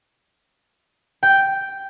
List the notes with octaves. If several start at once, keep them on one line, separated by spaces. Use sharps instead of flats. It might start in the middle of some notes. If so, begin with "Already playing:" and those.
G5